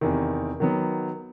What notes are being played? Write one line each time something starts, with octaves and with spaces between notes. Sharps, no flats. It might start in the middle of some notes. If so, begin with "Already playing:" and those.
E2 C3 D#3
D#3 F#3 B3